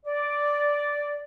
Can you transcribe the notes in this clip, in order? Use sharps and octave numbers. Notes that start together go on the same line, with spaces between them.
D5